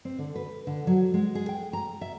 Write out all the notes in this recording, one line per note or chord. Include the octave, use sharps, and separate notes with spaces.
C4
D3
B4
D3
F#3
G#3
G#4
G5
A#5
E5